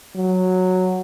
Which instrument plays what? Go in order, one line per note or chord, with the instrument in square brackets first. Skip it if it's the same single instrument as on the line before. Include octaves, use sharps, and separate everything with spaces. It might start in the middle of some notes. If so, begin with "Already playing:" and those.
[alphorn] F#3